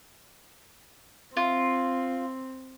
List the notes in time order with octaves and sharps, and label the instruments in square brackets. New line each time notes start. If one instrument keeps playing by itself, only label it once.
[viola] C4 [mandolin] F4